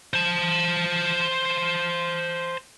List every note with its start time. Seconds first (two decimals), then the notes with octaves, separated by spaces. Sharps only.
0.14 C5 A5